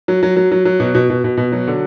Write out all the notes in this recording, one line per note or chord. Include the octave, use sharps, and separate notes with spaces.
F#3
F#3
F#3
F#3
F#3
B2
B2
B2
B2
B2
F#3
D3